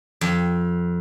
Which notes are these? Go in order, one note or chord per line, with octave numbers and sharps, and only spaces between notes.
F2